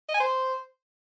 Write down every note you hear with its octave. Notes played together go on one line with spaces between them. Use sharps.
D#5
G#5
C5